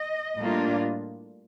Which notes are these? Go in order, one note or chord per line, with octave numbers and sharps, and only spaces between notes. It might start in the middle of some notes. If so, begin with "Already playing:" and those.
Already playing: D#5
A2 G3 A#3 D4 F4